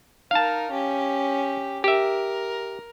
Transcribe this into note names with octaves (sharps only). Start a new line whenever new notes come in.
D#4 A#4 F5 A5
C#4 G4
G4 A#4 E5